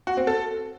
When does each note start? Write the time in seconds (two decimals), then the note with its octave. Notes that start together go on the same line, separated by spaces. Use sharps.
0.07 F#4
0.17 C4
0.27 A4